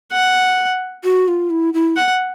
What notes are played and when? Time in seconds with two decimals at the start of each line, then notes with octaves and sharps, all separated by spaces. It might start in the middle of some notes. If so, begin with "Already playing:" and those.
0.12 F#5
1.04 F#4
1.28 F4
1.50 E4
1.74 E4
1.96 F#5